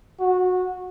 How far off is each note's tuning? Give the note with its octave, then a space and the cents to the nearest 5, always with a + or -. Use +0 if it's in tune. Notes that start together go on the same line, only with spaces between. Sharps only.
F#4 -20